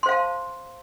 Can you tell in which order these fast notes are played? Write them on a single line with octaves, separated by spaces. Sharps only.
C6 C5 F5 A5